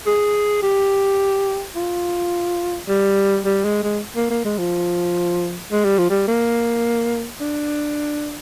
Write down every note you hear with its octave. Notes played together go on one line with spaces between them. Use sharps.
G#4
G4
F4
G3
G3
G#3
G#3
A#3
A#3
G#3
F3
G#3
G3
F3
G3
A#3
D4